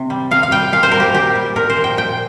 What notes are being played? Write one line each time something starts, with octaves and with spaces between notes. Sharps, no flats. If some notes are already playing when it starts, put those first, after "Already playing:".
Already playing: C3
G3
C3 F5
F5
G3 G5
A#2 F5
C5
G3 A#4
G4
A#2 G4
G3
A#2 A#4
C5
F3
G5
A#2 G5